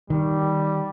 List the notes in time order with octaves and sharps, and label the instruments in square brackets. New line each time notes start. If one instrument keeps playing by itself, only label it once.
[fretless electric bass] D#3 [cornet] G3